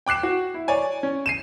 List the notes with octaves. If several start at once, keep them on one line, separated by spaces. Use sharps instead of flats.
G5 D6 F#6 C7 E7
F#4
E4
C#5 D5 G#5
C#4
C7 D#7 E7